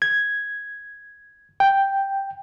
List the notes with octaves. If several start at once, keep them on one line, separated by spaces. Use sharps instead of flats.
G#6
G5